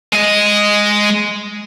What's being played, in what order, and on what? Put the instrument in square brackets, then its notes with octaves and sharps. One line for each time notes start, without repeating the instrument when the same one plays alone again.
[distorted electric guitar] G#3 D#5